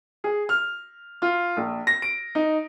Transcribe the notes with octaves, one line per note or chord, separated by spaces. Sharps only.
G#4
F6
F4
A#1
A#6
D7
D#4